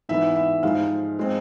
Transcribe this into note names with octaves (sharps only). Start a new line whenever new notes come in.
G#2 E3 B3 E5
E5
G#2 F3 G#3 F5
G#3 C4